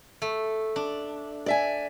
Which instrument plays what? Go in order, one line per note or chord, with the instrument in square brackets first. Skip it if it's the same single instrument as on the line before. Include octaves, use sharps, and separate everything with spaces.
[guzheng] A3
D4
[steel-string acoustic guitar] D5 E5 G#5